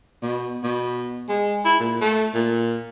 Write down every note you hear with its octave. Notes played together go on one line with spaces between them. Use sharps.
B2
B2
G#3
E4
A#2
A3
A#2